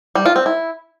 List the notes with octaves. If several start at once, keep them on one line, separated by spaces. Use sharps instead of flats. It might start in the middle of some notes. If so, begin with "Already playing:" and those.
G3
F4
C4
E4